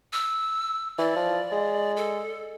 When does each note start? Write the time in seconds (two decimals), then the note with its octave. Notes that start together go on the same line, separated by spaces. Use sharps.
0.13 E6
0.98 E3 D5
1.16 F3
1.52 G#3
1.97 A4